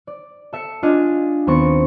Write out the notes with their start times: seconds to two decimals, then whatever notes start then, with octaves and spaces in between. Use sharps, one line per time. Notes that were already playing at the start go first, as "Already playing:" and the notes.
0.07 D5
0.53 A4 E5 C#7
0.83 D4 F4 D#5 G#5
1.47 D#2 B3 C4 C#6 C#7